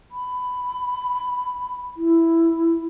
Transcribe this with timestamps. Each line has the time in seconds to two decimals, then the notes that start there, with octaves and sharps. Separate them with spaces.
0.12 B5
1.97 E4